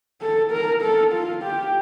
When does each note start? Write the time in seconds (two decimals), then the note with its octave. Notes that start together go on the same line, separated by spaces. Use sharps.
0.21 A4
0.51 A#4
0.82 A4
1.13 F4
1.43 G4